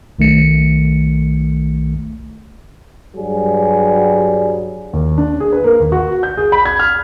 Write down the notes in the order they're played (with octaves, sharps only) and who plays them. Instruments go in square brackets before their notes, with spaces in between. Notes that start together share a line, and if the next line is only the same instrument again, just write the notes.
[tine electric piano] B1 D#3 A3 C#7
[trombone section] G2 F#3 G3 G#4
[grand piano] D#2
D4
G#4
B4
A#3
D#2
F#4
G6
G#4
B5
G#6
F6